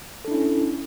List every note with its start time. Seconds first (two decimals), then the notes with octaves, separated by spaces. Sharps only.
0.25 A4
0.28 D4
0.31 E4
0.34 C#4